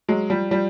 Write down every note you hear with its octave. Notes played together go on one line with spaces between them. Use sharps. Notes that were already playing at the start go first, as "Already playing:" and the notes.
F#3 G#3
F3 G3
F3 G3